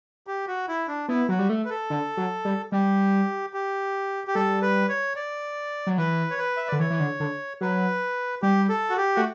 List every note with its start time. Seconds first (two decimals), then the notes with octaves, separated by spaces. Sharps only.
0.27 G4
0.47 F#4
0.68 E4
0.88 D4
1.09 B3 E4
1.29 F#3 F#4
1.39 G3
1.49 A3
1.65 B4
1.70 A4
1.90 D3
2.17 F#3
2.45 G3
2.72 G3 G4
3.54 G4
4.27 G4
4.35 G3 A4
4.62 B4
4.89 C#5
5.16 D5
5.87 F#3
5.98 E3 B4
6.31 C#5
6.38 B4
6.57 E5
6.68 D3 D5
6.79 E3 C#5
6.90 E3
7.00 D3
7.20 D3
7.61 F#3 B4
8.42 G3 G4
8.69 A4
8.90 F#4
8.97 G4
9.16 A3 F#4